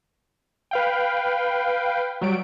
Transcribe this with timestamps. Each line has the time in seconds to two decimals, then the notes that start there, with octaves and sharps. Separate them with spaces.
0.71 B4 F5 G5
2.21 F#3 G3 D7